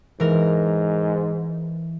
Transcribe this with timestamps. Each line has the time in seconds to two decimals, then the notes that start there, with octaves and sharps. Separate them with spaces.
0.20 G#2 E3 A#4